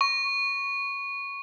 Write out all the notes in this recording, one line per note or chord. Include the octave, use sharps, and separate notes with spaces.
C#6